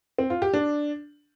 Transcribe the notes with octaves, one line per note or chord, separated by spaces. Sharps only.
C4
F4
G4
D4